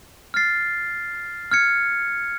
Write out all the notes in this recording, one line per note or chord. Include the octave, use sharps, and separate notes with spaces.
F6 A6 C7
F6 G#6 C#7